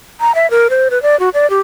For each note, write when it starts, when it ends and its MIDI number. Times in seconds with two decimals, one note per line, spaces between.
0.21 0.34 82
0.35 0.49 76
0.51 0.68 70
0.70 0.88 72
0.91 1.01 71
1.02 1.18 74
1.20 1.29 66
1.34 1.49 74
1.50 1.60 67